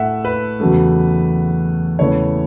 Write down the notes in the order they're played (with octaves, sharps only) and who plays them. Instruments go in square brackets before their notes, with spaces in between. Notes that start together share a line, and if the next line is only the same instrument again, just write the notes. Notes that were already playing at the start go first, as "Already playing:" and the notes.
Already playing: [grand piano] A2 A3 E5 F#5
B4
E2 C#3 F#3 A3
E2 C#3 E3 A3 C#5